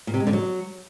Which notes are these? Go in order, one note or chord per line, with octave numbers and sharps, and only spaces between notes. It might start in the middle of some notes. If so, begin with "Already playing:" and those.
A#2
C3
G#3
D3
F#3